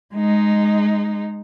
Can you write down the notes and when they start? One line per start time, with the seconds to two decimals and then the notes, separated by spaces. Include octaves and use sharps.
0.14 G#3 D#4